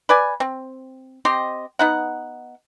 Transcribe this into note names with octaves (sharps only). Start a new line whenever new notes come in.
B4 D5 G#5
C4
C4 G4 D#5 C6
B3 D#4 F#5